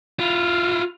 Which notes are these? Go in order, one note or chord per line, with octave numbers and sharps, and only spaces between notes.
E4 F4